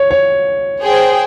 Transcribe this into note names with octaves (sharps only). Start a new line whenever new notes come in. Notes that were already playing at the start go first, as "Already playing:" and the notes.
Already playing: C#5
C#5
G#4 C5 G5